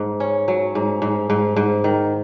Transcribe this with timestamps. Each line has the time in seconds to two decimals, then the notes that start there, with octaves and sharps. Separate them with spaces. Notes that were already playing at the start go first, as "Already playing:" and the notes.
Already playing: G#2
0.20 C#4
0.48 F#3
0.75 G#2
1.02 G#2
1.30 G#2
1.56 G#2
1.84 D#3